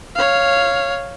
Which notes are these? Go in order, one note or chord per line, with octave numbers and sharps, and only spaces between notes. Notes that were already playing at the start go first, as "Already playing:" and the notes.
C#5 F5